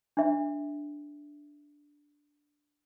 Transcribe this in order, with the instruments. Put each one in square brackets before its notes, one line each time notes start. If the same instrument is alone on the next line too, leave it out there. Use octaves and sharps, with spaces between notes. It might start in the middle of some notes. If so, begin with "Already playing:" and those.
[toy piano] D4 E5